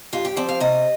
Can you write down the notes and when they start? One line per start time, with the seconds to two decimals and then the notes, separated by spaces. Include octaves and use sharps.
0.13 G2 F4
0.25 G4
0.36 F3 C4 D5
0.49 F5
0.60 C3 D#5